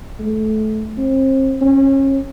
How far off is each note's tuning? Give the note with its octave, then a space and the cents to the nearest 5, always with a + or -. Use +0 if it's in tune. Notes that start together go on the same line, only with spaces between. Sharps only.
A3 -25
C4 +35
C#4 -30